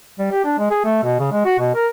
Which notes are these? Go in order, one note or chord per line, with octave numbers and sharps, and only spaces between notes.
G3
G4
D4
G#3
G#4
A3
B2
C#3
G#3
F#4
B2
A#4